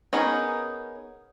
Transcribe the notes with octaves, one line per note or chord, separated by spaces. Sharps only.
B3 C#4 D#4 G#4 A#4